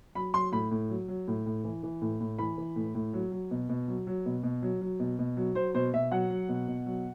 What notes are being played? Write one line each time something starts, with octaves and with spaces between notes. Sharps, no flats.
F#3 B5
F#3 C6
A2 B5
A2
F#3
F#3
A2
A2
E3
E3
A2
A2
E3 B5
E3
A2
A2
F#3
F#3
B2
B2
F#3
F#3
B2
B2
F#3
F#3
B2
B2
F#3
F#3 C5
B2 C5
B2 E5
F#3 F#5
F#3
B2
B2
F#3